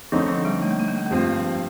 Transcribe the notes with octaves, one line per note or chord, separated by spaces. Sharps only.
D3 F3 A3 C4 D#4
F3
G3
A3
A#3
A3
A#3
A3
A#3
G2 F3 A3 C4